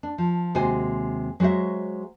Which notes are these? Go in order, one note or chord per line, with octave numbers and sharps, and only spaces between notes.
D4
F3
D#2 C3 G#3 F#4 C5 G#5
F#3 G#3 F#4 C5 E5